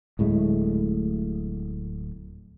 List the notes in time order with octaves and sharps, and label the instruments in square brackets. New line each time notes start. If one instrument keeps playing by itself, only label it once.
[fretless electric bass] D1 A2 G#3 A3